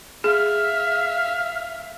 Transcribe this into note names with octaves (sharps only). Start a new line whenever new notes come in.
G#4 E5 F5 F6